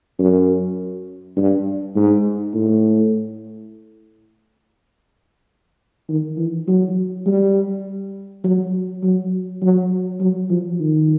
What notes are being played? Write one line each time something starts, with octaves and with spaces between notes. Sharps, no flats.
F#2
G2
G#2
A2
D#3
E3
F#3
G3
F#3
F#3
F#3
F#3
F3
D#3